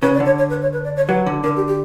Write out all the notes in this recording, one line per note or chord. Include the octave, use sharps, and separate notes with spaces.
C#3 B4
D5
D3
C#5
C#5
B4
C#5
B4
D5
C#5
F#3 B4
D3
D3 A#4
G4
G4